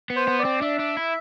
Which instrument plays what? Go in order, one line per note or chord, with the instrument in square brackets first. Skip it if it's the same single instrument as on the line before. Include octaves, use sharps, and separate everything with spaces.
[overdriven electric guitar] B3
[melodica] C5
[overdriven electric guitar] B3
[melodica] D5
[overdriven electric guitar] C4
[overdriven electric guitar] D4 [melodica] E5
[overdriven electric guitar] D4
E4